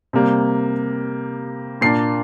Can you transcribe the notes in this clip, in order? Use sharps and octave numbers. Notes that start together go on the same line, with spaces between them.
C3 G3 A#3
A#2 A#3 D4 C7